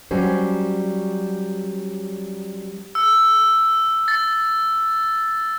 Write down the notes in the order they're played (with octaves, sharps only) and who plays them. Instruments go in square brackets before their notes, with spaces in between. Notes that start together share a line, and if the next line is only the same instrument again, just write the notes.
[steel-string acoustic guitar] F#3 G3 C#4 C5
[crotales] E6
A6